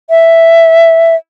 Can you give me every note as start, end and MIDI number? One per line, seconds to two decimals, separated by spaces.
0.10 1.15 76